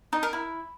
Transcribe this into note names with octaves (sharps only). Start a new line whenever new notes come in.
D#4
A#4
E4